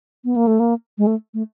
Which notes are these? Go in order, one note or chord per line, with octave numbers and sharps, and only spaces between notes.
B3
A#3
A3
A#3
G#3
A3
A3